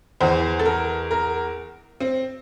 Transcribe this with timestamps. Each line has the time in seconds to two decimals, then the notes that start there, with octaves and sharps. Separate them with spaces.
0.21 E2 E3 C5
0.59 A4
0.65 A#4
1.11 A#4
2.00 C4